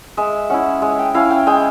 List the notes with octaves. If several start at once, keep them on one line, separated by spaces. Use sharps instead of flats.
G#3 E5
C#4 E4 F#5
G#3
G5
C#4 E4 F5
G5
G#3 G5